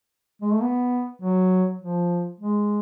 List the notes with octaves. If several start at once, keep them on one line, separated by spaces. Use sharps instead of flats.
G#3
A3
B3
F#3
F3
G#3